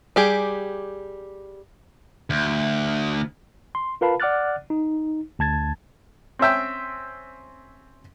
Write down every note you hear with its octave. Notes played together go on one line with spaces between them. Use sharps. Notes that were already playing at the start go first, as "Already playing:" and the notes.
G3 G4 G#4
D2
C6
F4 A#4 B4 F5 A5 B5
D5 F#5 D6 F6 F#6 A6
D#4
D2 A5 G#6 A6
C4 C#4 E5 G5